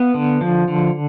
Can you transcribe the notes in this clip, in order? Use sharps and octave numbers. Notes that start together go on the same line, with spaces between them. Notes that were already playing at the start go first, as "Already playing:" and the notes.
Already playing: B3 F5
D3
F3
D3